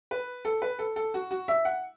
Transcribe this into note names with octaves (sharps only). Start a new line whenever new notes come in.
B4
A4
B4
A4
A4
F#4
F#4
E5
F#5